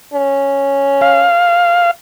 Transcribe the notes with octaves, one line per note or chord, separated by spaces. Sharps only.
C#4
F5